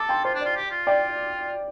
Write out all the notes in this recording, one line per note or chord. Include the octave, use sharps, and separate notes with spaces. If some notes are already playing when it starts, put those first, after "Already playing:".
Already playing: A4 A5 D6
G5 C6
F4 C5
D4
F4 D5
G4
F4
D5 G5